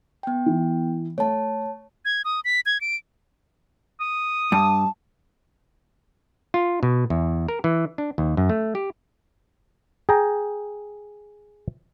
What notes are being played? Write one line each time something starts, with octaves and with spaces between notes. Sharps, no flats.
B3 G5
E3
A3 C#5 A5
G#6
D#6
B6
G#6
D7
D#6
G2 A5
F4
B2
E2
A#4
E3
D4
D#2
F#2
A3
G4
G#4 G5 A#5